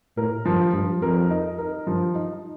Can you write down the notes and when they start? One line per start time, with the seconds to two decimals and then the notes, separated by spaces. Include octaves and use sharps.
0.17 A2 A#4
0.45 G2 F3
0.74 G2 F3
1.02 F2 A#4
1.30 D#4
1.58 A#4
1.87 G2 F3
2.15 D#4